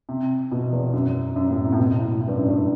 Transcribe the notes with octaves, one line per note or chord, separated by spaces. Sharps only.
C3
B2
E2
F#2
F#2
A2
C3
A2
B2
A2
A2
G2
F#2
G2